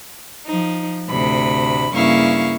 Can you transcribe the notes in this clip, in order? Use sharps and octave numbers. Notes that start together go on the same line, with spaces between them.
F3 D#4
D2 A2 C3 B5
G2 C#3 A#3 E4 F5 C#6